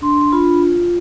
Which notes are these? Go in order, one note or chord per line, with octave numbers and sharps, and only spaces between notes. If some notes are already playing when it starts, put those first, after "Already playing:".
D4 C6
F4 B5